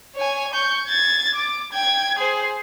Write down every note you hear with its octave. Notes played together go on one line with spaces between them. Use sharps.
C#5 G#5
C#6 G6
G#6 A6
D6
G5 G#6
G#4 C5